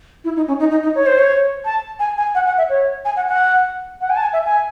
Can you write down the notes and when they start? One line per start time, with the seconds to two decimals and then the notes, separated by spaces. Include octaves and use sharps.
0.24 E4
0.36 D#4
0.48 C#4
0.59 D#4
0.71 D#4
0.83 D#4
0.95 C#5
1.06 C5
1.18 C#5
1.65 A5
1.99 G#5
2.17 G#5
2.35 F#5
2.46 F#5
2.58 E5
2.69 C#5
3.05 G#5
3.16 F#5
3.28 F#5
4.01 F#5
4.10 G#5
4.16 A5
4.22 G#5
4.33 E5
4.45 G#5